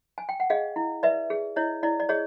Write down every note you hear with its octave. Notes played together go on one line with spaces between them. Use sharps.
G#5
G5
F#5
G#4 D#5 F5
E4
B4 D5 E5
G#4
E4 C#5 D#5
E4 D5
D5
G#4 C#5 D#5